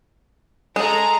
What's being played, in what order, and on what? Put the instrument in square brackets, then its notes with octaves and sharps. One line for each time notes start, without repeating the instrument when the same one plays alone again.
[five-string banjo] G#3 [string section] G#4 A4 A#5